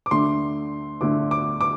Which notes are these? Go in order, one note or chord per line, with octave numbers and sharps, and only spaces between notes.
D6
D2 D3 A3 C6
D2 D3 A3 D6
D6
D6